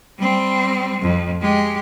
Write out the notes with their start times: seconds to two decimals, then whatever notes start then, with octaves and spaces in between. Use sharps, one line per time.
0.18 G3 C4
1.02 F2
1.41 G#3 G4